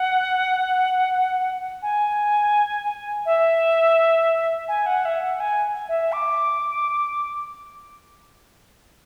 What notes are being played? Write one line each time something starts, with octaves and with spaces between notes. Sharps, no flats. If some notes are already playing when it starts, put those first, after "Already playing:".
Already playing: F#5
G#5
E5
G#5
F#5
E5
F#5
G#5
E5
D6